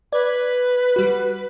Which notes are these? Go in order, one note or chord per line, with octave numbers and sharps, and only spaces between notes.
B4 D5 G#6
G3 F#4